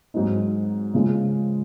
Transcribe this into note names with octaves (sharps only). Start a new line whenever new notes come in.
G#2 F#3 C4 D#4
C#3 F3 G#3